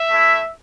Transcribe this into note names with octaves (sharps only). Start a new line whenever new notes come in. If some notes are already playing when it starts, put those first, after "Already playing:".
Already playing: E5
A3 E4